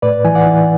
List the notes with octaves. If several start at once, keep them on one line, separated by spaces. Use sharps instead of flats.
A2 B4 D5
E3 G#5
D5 F#5
E3